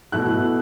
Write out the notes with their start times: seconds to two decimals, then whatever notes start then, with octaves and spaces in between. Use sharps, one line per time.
0.12 B2 A3 E4 F#6